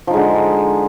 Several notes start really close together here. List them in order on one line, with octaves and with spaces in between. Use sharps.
F3 D#4 G#3 D3